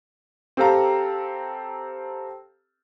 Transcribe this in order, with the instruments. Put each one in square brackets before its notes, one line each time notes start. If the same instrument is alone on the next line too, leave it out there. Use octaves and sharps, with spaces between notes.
[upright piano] C4 G4 A4 F5 A#5